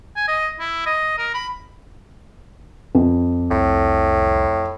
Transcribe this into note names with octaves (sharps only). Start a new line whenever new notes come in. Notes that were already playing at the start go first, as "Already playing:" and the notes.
G#5
D#5
E4
D#5
A#4
B5
F2
C2 A2